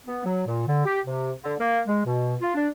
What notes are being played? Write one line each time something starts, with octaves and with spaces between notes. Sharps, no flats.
B3
F#3
A#2
D3
G4
C3
D3
A#3
G#3
B2
F4
D4